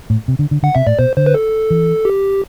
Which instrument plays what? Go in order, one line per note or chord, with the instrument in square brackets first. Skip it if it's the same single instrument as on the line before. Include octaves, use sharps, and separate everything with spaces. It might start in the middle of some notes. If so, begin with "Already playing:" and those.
[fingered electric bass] A2
C3
D3
D3
[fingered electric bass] D3 [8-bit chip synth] F#5
[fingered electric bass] C3 [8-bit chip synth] E5
[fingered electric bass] A2 [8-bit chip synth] D5
[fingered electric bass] B2 [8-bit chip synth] C5
[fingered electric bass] D3 [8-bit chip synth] C5
[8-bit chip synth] B4
A4
[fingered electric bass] E3
[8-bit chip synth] G4